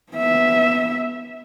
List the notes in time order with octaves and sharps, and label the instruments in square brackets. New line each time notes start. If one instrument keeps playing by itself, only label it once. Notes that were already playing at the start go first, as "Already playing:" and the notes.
[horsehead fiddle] B3 E5